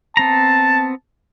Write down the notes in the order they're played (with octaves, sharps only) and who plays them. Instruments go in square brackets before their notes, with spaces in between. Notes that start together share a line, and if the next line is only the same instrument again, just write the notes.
[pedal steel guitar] B3 C4 A#5 [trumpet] A5